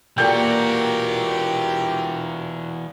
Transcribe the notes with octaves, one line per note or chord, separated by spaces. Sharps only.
A#2 E3 F#4 G4 A4 G5 A#5